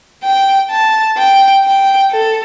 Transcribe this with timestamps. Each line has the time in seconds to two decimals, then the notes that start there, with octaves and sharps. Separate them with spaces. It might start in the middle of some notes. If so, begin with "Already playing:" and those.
0.23 G5
0.71 A5
1.17 G5
1.65 G5
2.12 A4